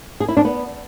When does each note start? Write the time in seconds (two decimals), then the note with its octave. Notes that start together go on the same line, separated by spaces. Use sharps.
0.20 G#4
0.29 E4
0.37 D4
0.45 B3